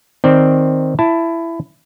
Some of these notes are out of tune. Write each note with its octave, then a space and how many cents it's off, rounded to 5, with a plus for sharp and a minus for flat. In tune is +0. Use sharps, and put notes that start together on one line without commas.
D#3 +0 C4 +0 D5 +0
E4 +15 A5 +0